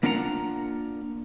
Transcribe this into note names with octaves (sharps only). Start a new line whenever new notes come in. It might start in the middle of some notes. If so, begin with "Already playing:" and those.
A#3 D4 F4 A#4 F#5 A#5